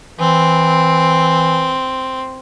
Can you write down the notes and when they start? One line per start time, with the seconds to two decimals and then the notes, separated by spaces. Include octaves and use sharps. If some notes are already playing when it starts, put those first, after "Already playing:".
0.20 E3 C4